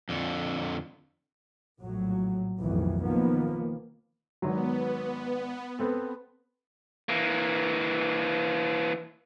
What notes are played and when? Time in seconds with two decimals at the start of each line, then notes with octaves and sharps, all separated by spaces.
0.09 F2 D3
1.80 A#1 A2 F#3
2.61 B1 F2 A2 D#3 E3
3.04 D#3 F3 A#3 B3
4.42 G#1 F#3 B3
5.79 B3 C4 A4
7.09 E3 A#3